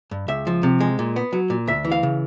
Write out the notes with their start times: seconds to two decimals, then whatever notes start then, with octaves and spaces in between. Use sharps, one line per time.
0.11 G2
0.28 C#2 E5
0.47 F3
0.63 C3
0.80 G#3
0.99 A#2
1.16 B3
1.33 F#3
1.50 A#2
1.67 D2 E5
1.85 E3
1.92 F5
2.03 C#3